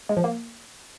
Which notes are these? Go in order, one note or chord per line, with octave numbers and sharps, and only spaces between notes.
G#3
F3
A#3